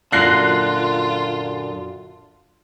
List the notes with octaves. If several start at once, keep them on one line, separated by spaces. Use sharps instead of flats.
F#2 A#2 D3 F4 F#6 A#6 C7